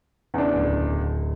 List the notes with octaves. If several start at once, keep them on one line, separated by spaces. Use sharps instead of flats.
E2 C#3 D4
D1